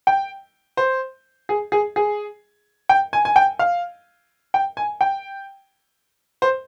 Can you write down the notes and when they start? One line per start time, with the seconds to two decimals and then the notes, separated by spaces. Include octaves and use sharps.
0.07 G5
0.77 C5
1.49 G#4
1.72 G#4
1.96 G#4
2.89 G5
3.13 G#5
3.25 G#5
3.36 G5
3.59 F5
4.54 G5
4.77 G#5
5.01 G5
6.42 C5